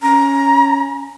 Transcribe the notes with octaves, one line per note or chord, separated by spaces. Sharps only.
C#4 A#5